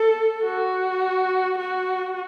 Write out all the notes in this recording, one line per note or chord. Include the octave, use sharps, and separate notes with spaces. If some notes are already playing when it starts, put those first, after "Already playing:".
Already playing: A4
F#4
F#4